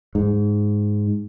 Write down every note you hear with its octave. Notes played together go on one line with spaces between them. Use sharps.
G#2